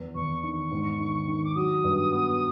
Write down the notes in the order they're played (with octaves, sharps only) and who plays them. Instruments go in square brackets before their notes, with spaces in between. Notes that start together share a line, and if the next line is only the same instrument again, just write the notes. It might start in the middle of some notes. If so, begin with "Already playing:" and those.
Already playing: [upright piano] E2
[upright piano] E2 [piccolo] C#6
[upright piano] D#3 [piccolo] C#6
[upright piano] G#2
D#3
D#3
[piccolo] D6
[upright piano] F#3 [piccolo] D#6
[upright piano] G2
B3